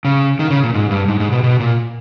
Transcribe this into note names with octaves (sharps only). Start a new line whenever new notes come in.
C#3
D#3
C#3
A#2
G#2
G2
G#2
G#2
B2
B2
A#2